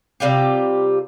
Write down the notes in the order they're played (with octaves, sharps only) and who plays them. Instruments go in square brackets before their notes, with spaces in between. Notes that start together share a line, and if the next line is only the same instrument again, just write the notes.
[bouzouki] C3 G3 F4 G4